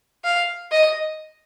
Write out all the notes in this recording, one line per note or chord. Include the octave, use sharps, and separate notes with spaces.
F5
D#5